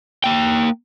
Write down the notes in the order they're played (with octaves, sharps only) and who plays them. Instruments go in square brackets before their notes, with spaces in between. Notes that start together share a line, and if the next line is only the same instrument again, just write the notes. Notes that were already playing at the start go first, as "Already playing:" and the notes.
[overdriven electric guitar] A#3 G5